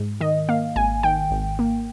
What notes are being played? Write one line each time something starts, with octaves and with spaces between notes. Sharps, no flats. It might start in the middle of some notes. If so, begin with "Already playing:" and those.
Already playing: G#2
D#3 D#5
A#3 F5
G#1 G#5
D#3 G5
G#1
A#3